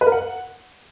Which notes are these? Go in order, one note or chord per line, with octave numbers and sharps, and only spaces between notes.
B4
A#4
F#5